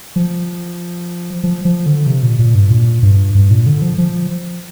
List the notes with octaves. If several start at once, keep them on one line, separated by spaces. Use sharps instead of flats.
F3
F3
F3
D3
C3
A#2
A#2
G2
A#2
G2
G2
A#2
D3
F3
F3